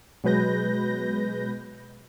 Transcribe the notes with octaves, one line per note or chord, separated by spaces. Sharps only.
B2 F#3 G#3 B4 G6 A#6